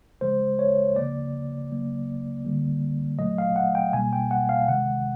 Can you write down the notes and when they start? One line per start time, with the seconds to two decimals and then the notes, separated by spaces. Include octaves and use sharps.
0.21 C#3 F3 G#3 C5
0.59 C#5
0.96 C#3 F3 A#3 D5
1.71 C#3 F#3 A#3
2.45 D3 G3 A#3
3.19 A#2 F#3 A3 D#5
3.38 F5
3.56 F#5
3.75 G5
3.93 B2 G3 A#3 G#5
4.13 G5
4.31 F#5
4.49 F5
4.68 C3 D#3 G#3 F#5